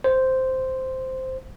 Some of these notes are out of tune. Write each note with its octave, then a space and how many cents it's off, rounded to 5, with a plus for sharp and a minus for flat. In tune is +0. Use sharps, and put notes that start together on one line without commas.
C5 -5